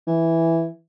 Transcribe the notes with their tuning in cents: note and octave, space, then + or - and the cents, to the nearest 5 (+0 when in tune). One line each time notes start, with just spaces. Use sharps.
E3 +0